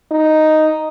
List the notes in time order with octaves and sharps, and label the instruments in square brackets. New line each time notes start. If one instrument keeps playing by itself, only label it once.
[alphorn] D#4